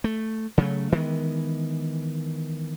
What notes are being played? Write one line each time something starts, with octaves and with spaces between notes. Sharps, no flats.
A3
C#3 F#3 G3 A3
D#3 E3 G#3 B3